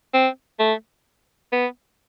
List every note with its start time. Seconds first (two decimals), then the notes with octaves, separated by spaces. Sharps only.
0.14 C4
0.60 A3
1.52 B3